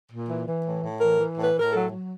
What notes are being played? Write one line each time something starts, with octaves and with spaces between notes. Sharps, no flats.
A#2
E3
E3
A2
A2
E3 A#4
E3
A2
B4
A2
A#4
F#3 A4
F#3